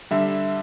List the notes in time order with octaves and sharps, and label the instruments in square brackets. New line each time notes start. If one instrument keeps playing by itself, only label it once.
[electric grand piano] D3 G3 E5